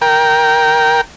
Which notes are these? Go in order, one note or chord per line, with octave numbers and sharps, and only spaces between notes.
A#4 G5